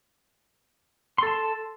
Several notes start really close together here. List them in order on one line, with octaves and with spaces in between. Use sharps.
C6 A4 A5